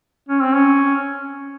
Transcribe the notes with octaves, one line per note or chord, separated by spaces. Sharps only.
C#4
C4
C#4